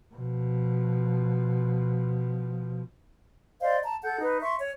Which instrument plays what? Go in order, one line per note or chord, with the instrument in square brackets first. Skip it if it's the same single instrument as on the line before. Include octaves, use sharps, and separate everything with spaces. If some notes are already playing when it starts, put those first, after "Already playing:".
[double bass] B2 F3
[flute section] C5 D5 D#5 F5
A5 A#5
A4 F#5 G6
D#4 B4
E5 C6 C#6
C#5